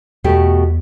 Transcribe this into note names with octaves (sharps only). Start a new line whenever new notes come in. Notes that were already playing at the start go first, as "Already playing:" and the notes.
E2 B2 A3 G4